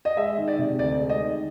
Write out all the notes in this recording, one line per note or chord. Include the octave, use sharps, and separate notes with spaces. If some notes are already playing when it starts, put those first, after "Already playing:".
D#5
G#3 E5
D#3
D5
C3
D2 D5
G#3
D#5
D#3